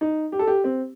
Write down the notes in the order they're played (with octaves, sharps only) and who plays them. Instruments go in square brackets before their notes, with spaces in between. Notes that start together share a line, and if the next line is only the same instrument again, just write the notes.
[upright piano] D#4
G4
A4
G4
C4